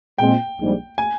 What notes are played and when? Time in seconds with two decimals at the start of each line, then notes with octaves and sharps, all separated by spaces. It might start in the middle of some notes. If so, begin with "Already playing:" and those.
0.18 A#2 G#3 C4 G5
0.59 A#1 G#2 G3
0.98 G#5